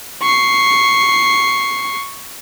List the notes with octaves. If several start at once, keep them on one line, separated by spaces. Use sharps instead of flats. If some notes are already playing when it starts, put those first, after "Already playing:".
C#6 C7